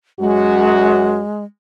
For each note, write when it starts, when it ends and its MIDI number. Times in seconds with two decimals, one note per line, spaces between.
0.20 1.21 42
0.20 1.44 56
0.20 1.21 66